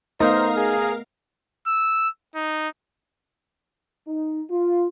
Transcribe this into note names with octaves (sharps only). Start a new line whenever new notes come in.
A3 B3 D#4 A#4 C5 D#5 F5
G#4
E6
D#4
D#4
F4